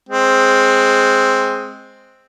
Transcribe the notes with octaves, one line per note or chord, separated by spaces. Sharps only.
G#3 C4